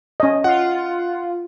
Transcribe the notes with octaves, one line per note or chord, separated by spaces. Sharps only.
C#4 D#5
F4 F#5